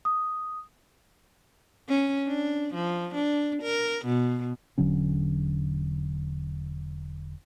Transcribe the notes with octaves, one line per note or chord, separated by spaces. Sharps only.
D#6
C#4
D4
F3
D4
A#4
B2
E1 D3 F#3 C#4